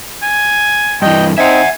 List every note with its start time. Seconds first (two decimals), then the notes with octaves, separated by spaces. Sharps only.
0.23 G#5
1.02 G2 E3 D#5 G5
1.38 C4 D#4 E5 F#5 G#5